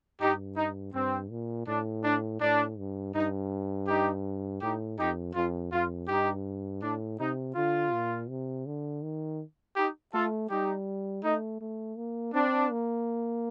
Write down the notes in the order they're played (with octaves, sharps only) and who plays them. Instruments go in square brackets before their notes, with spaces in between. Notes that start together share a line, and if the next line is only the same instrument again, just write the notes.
[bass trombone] G2 [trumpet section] D#4 G4
[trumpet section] D#4
[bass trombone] G2 [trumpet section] C4
[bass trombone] A#2
[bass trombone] A2 [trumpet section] D4
[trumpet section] D4
[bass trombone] A2 [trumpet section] D4
[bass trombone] G2
[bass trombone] G2 [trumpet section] D#4
[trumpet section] D#4 G4
[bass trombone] A2 [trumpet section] D#4 G4
[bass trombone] F2 [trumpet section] D#4 G4
[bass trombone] F2 [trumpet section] F4
[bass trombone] F2 [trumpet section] F4
[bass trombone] G2 [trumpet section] D#4 G4
[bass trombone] A2 [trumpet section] D4
[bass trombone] C3 [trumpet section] D#4
[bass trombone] D3 [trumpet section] F4
[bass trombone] A#2
C3
D3
D#3
[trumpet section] D#4 G4
[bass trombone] A3 [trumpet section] F4 A4
[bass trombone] G3 [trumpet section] D#4 G4
[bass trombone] A3 [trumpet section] D#4
[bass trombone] A3
A#3
[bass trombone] C4 [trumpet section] D4
[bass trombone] A#3